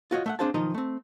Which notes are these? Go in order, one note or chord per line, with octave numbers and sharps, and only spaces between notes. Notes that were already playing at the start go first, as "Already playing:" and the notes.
F4 F#4 C#5 D#5
A3 E5 F#5
C4 D4 G#4 C5 F5 A5
B1 D#3 F3 D#4 D#5 A#5
A3 C4